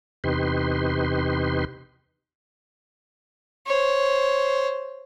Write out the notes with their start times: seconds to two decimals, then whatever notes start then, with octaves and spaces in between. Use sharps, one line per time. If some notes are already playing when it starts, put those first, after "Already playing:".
0.24 E2 C3 D#4 G4 B4 C6
3.67 C5 C#5